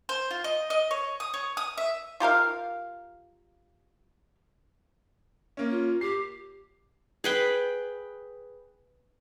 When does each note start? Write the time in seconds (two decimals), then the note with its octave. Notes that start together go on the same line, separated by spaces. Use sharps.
0.09 C5
0.31 F4
0.44 D#5
0.70 D#5
0.91 C#5
1.20 D#6
1.34 C#5
1.57 D#6
1.78 E5
2.20 F4 G4 A#4 F5
5.57 A#3 C#4
5.71 F4
6.01 G4 C7
7.24 G#4 B4 G5